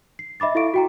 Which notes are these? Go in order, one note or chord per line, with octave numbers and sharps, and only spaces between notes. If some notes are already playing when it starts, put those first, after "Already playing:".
C7
D#5 E5 B5 D6 A6
E4 A4 E5 F5 C#6 D7
F#4 G5 A#5